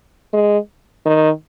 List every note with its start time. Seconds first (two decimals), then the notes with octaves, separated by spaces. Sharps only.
0.33 G#3
1.05 D#3